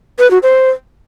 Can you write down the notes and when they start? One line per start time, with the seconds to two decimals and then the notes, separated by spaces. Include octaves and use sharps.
0.19 B4
0.31 F#4
0.43 C5